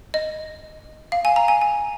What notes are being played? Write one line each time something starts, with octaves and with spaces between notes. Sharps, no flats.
D#5
F5
G#5
A#5
G#5
G#5